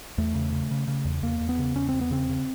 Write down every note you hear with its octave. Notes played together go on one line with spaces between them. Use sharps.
E2 A3
C#3
C#3
C#3
C#3
E2
E2 A#3
E2
B3
C#3
E2 C#4
E2 C4
B3
C#3 C4
C#3